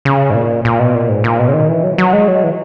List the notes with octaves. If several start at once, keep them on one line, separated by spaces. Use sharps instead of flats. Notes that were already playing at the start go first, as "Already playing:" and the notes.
C#3
G#2
A#2
A#2
B2
A#2
G#2
A#2
B2
C#3
D#3
E3
F#3
F#3
G#3
F#3
E3